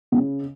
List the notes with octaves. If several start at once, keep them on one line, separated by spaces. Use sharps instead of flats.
C#3